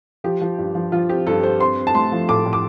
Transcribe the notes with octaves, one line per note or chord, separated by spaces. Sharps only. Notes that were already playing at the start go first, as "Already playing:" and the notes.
F3 G4
F3
G2
F3
F3 F4
C4 G4
G2 A4
G2 C5
C4 C6
C4
A5
A3 C6
F3
A2 D6
A2
D6